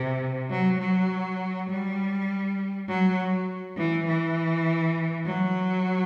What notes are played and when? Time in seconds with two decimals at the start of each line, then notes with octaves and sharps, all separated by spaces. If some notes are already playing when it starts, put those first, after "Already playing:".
Already playing: C3
0.50 F#3
0.80 F#3
1.69 G3
2.89 F#3
3.77 E3
4.07 E3
5.26 F#3